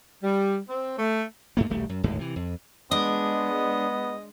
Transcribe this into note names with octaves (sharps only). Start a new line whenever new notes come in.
G3
C4
A3
G2 A3 A#3
D#1 B1 G3 A3
F#2
G1 D#2 A2 G#3
C3 E3
F2
G#3 B3 D4 D#5